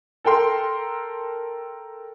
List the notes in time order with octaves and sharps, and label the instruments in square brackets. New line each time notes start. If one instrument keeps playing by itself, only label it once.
[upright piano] A4 A#4 G5 C6